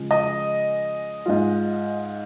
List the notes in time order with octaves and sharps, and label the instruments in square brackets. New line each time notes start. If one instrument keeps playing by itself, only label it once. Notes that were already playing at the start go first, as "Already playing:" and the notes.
Already playing: [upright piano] C#3 F3 G#3
D#5
G#2 G#3 F4